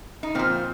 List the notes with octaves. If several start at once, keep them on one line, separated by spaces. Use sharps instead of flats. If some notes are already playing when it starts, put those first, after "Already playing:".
D#4
A#2 F3 C4